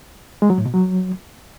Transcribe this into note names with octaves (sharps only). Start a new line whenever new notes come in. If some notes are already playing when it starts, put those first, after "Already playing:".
G#3
F#3
A2
B2
F#3